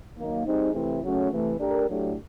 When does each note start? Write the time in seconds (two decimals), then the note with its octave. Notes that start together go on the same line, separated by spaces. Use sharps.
0.16 D#3 F#3 A#3 D#4
0.45 G3 C4 D#4 G#4
0.73 C3 E3 A3 C4 E4
1.02 C#3 F#3 A3 C#4 F#4
1.30 C3 E3 A3
1.59 A3 D4 G4 A#4
1.88 A2 F#3 A3 D4 G4